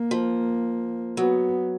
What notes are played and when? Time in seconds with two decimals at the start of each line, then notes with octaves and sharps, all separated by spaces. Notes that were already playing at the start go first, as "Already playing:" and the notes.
Already playing: A#3
0.11 F3
1.17 F#3 B3